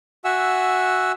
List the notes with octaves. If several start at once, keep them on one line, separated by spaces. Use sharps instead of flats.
F#4 E5 F#5 G#5 E6